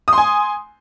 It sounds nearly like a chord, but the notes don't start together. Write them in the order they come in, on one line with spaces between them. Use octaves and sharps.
D#6 C6 G#5